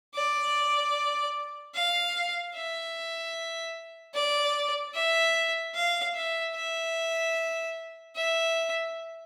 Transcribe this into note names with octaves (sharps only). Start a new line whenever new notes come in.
D5
F5
E5
D5
E5
F5
E5
E5
E5